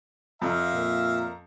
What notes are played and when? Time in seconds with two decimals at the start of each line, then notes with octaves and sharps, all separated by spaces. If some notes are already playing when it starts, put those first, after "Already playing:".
0.42 F2 E5 F5 A#5
0.73 A#2